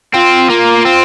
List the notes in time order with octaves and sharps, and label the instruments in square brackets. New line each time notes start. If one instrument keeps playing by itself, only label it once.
[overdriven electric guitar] C4 [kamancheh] F4
[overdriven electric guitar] A#3
C4